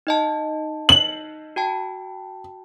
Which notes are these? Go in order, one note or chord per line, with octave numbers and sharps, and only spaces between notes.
D#4 D#5 A5
F#7
F#4 G5 A5